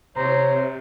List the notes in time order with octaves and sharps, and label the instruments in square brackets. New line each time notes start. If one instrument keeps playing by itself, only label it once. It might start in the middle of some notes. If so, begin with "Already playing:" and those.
[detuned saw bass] C3 [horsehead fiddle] C5 [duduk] C#5 [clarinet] A#5